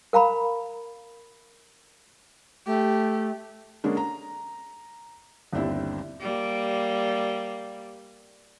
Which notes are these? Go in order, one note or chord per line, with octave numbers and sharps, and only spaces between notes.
A#4 F5 A#5 B5
A3 G4
D3 G#3 A#3 C#4 D4
A#5
G1 D#2 C4 D4 E4
G3 A#3